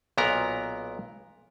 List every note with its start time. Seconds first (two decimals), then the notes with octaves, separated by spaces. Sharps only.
0.18 B1 A#2 B3 A#4 A#5